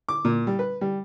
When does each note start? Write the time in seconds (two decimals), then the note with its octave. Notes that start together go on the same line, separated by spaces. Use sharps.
0.09 D6
0.25 A#2
0.47 G3
0.59 B4
0.81 G3